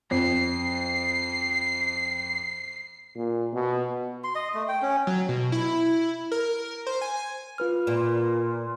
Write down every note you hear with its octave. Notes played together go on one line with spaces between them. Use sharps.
F2 C7
A#2
B2
C6
D#5
A3
G5
C#4
F#3
B2
E4
A#4
C5
G#5
F4 B4 F6
A#2